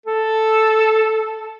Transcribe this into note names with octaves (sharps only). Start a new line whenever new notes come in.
A4